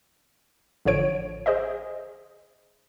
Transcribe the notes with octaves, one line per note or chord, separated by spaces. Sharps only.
A1 D3 F3 C#5 D7
G#4 C5 D#5 E5